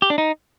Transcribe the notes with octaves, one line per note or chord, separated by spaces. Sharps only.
G4
D4
D#4